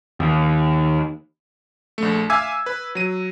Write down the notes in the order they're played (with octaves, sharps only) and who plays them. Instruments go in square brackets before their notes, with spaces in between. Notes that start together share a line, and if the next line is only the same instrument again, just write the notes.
[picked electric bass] D#2
[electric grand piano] A#1 A3
E5 F5 G#5 D6 E6 G#6
B4
F#3 D#7